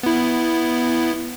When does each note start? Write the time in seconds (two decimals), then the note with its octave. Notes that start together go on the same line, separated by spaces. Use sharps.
0.03 B3 E4